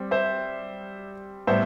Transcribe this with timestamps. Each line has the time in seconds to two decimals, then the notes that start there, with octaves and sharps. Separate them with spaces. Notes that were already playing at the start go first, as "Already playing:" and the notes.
Already playing: G3 C4
0.11 C5 E5
1.47 A2 G3 B3 C5 E5